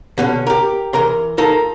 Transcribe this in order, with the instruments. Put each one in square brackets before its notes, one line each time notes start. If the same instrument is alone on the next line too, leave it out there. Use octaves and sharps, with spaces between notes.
[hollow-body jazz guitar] B2 D3 C#4
G4 A#4
E3 A#4 A#5 C6
D#4 F4 A4 A#4